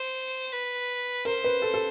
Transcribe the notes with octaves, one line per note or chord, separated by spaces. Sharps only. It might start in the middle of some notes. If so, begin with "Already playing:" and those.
Already playing: C5
B4
A#4 C5
B4
A4
A4